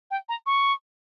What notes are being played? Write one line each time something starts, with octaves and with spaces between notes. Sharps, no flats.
G5
A#5
C#6